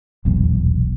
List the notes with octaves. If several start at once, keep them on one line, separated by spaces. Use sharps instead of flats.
D#1 B1 E2